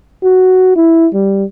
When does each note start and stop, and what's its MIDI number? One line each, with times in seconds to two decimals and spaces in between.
0.23 0.76 66
0.76 1.07 64
1.13 1.44 55